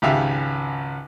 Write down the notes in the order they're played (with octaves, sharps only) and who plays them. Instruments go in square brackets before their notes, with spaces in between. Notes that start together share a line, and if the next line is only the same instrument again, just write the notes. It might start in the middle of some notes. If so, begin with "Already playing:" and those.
[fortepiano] G#1 C#2 G4 E5 F5